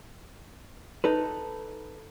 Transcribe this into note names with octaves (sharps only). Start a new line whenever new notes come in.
D#4 A4 B4